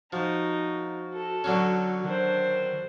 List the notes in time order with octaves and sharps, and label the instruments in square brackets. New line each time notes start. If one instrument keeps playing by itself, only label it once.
[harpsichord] F3 [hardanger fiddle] D#4 [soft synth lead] F#4
[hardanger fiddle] A4
[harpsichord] D3 F#3 C#4
[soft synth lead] D#3 [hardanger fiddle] D4 C5